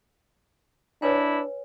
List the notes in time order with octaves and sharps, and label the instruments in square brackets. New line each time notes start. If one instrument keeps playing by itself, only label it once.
[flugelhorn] D4 [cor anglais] E4 [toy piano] B4 C#5 G#5